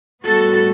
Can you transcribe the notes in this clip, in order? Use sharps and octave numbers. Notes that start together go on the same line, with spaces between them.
A2 G3 B3 F#4 A4